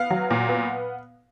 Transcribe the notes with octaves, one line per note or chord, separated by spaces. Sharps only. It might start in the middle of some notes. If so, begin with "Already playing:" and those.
Already playing: B3 F5
F#3
A#2
B3